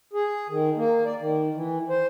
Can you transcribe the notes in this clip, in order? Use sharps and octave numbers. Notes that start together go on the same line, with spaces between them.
G#4
D#3
A#3
D5
D#3
E3
C5